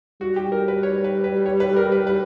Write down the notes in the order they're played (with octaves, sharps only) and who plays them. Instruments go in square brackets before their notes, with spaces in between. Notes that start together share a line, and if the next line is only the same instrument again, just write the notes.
[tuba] G3 [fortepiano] F#4
[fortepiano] G4
A#4
B4
C#5
B4
B4
C#5
B4
A#4
B4
B4